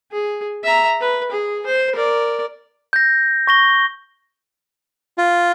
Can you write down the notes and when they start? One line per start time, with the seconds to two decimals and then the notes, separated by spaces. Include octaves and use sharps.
0.12 G#4
0.64 E5 A#5
1.01 B4
1.31 G#4
1.66 C5
1.95 A#4 D5
2.93 G6 A#6
3.47 C#6 A#6 G7
5.18 F4